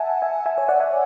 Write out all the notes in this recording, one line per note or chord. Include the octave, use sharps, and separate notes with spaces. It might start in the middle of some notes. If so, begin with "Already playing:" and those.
Already playing: E5 F#5 G#5 A5
E5 G#5
E5 G#5
C#5 E5
D5 F#5
E5 G#5